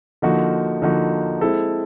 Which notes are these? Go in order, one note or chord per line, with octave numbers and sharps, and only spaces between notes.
D3 F3 A#3 D#4 F#4
D3 F3 A#3 D#4 F#4
G#3 C4 E4 A4